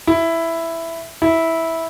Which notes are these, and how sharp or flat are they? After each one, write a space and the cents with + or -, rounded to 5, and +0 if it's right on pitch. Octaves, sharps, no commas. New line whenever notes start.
E4 +5
E4 -10